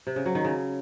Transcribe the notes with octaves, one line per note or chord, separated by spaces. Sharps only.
C3
C#3
F#3
D#3
C#3